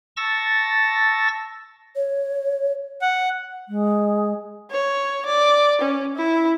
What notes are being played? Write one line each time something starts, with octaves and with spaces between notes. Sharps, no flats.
A5 C#6 E6 A6 A#6
C#5
F#5
G#3
C#5
D5
C#4
E4